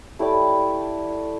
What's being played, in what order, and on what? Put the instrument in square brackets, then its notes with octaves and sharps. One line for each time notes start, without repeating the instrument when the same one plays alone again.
[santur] A3 E4 G4 D5